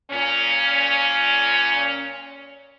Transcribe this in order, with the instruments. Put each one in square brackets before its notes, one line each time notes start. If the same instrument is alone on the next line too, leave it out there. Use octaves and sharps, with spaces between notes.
[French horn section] A#2 C#4